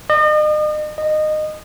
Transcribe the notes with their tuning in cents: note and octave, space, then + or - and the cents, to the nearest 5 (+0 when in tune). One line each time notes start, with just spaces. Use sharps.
D#5 -40
D#5 -20